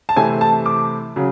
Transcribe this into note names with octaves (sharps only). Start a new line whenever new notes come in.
A5
C3 E3 A3 C4 G#5
A5
D6
C#3 F#3